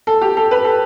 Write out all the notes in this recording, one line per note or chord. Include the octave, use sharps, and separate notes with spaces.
A4
G4
A4
B4
A4